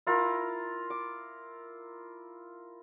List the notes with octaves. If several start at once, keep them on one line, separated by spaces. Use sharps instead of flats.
E4 F4 A#4
D6